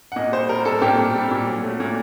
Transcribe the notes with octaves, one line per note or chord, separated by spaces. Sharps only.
F#5
A#2 D#5
G3 C5
G3 A#4
A#2 A4
A#2 G4
A#2
G3
A#2
F#3
A3
A#2